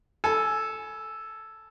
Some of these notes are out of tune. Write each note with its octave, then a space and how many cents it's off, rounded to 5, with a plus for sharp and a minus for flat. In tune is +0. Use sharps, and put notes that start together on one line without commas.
A4 +0 G#5 +20 B5 +0